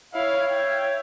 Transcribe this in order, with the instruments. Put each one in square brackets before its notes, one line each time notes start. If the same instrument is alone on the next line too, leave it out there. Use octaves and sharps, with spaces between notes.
[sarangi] E4 [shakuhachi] C#5 [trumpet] F5
[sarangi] E5 [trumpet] G5